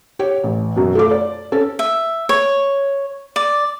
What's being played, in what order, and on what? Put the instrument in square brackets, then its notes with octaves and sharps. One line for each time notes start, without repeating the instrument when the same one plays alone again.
[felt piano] G4 C#5
A1
F#2 B2
A3 F4 D6
D5
C#4 A4
[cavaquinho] E5
C#5
D5